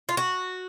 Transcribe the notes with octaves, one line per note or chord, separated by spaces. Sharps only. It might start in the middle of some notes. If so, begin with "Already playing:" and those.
F4
F#4